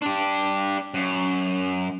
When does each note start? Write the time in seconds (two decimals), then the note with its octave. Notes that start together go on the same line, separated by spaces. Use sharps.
0.02 D4 G4
0.94 F#2